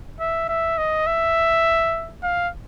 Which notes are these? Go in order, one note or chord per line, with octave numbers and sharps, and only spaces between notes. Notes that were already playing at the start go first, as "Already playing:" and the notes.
E5
E5
D#5
E5
F5